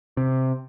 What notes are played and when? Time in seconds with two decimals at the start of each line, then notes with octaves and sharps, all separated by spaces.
0.17 C3